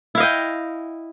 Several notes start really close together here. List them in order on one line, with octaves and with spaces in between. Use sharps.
E4 F5 D#5 G5